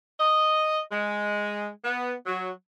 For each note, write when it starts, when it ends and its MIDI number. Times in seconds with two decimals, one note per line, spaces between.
0.20 0.79 75
0.92 1.68 56
1.85 2.13 59
2.27 2.50 54